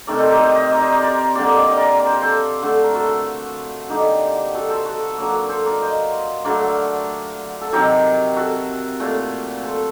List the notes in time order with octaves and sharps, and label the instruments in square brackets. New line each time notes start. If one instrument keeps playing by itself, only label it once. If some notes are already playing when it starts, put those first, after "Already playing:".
[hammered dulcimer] C3 D#3 A3 A#4 D5
A4 C5
G4 A#4
C5 D#5
C5 D5 D#5
A#4 D5
C5 D#5
A#4 D5
A#4 D5
D3 G3 A#3 D5
D#5
D5
D#5
A#4 D5
D5
C5
A#4
A4 C5
D3 A3
A#4
F#4 A4
D3 G3 A#3 D#4 G4
F#4 A4
A4 C5
F#4 A4
D3 F#3 A#3
A4 C5
A#4 D5
C5 D#5
D3 F#3 A3 A#4 D5
A4
C3 D#3 F#3 G4 A#4
F#4 A4
A#2 A3
A4 C5